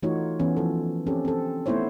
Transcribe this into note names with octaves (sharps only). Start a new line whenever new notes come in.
E3 A3 D#4 F4 F#4 C#5
E3 B3 C#4
F3 A4
C4 C#4 G4 A4
C4 A4
A3 B3 D#4 E4 C5 C#5